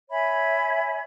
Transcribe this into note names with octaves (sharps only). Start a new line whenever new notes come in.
C#5 E5 G#5 B5